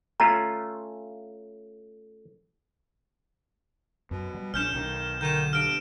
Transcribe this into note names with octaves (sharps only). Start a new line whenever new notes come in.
A3 C#4 F4 A#5
F#2 B2
G3
A#1 C#4 D4 F6 G6 E7
B1 D#3
D3 D#3 G6 D#7 E7
G2 F6 D7